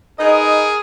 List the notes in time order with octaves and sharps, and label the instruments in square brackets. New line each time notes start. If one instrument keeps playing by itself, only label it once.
[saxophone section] D#4 B4 D#5 [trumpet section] G#4 A#4